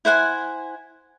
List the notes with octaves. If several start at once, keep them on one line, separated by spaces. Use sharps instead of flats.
E4 C5 F#5 G#5